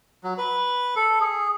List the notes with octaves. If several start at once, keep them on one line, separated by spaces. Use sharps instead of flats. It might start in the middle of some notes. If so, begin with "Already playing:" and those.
F#3
B4
A4
G#4